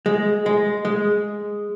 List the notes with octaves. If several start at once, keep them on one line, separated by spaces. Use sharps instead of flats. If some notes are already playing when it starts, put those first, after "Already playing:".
G#3
G#3
G#3